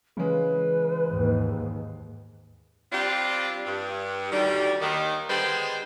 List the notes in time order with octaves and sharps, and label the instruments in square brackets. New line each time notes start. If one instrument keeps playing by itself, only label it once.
[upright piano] C#3 G#3 [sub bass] E3 [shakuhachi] B4
[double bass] D#2 G#2
[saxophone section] G3 C4 D4 F4 G4
G2
D2 D#3 G3
D#2 D#3
D3 G3 G#3 B3 C5